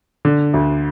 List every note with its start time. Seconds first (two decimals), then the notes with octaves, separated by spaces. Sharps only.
0.25 D3
0.54 D2